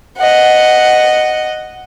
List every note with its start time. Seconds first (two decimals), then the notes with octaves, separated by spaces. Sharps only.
0.18 D#5 F#5